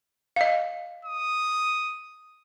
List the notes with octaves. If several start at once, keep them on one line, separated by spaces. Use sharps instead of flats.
D#5 F5
D#6